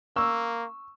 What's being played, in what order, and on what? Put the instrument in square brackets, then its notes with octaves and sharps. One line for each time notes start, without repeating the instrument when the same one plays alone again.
[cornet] A#3 [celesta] C#6 [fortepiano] E6